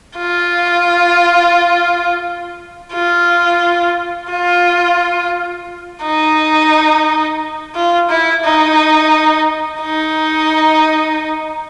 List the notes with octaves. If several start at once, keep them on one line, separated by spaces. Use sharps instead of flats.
F4
F4
F4
D#4
F4
E4
D#4
D#4